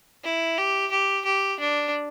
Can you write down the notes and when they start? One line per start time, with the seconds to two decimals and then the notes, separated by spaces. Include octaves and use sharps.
0.24 E4
0.58 G4
0.91 G4
1.25 G4
1.60 D4